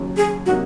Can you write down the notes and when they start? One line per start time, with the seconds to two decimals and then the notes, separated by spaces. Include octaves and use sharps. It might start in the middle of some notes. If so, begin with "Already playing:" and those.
Already playing: D#2 C#3 F#3
0.17 G#4
0.46 C3 F#3 A#3 D#4 F#4